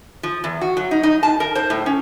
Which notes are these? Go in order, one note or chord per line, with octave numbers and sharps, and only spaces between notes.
F3
E2
F#4
F#3
D#4
D#4
A5
A#4
C5
A2
C#4